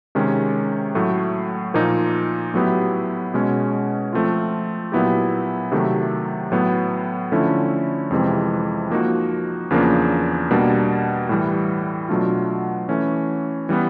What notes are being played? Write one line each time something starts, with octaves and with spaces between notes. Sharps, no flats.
C3 D#3 G#3 C#4
A2 F#3 A3
A#2 F3 A#3 D#4
A2 F#3 B3 E4 G4
B2 G#3 C#4
F3 A3 C4 F4
A#2 F#3 B3 E4 G4
C3 D#3 F#3 A3
A2 F#3 B3
D3 F3 A3 C#4 E4
F2 C3 E3 G#3 C4
F3 A#3 D#4 F#4
E2 C#3 F3 A#3 D4
B2 G3 A#3 D4
A2 E3 G3
B2 F#3 A3 D4 F4
E3 A3 C#4
E3 G3 B3